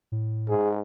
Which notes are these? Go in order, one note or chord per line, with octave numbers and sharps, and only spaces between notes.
A2
G#2 G#4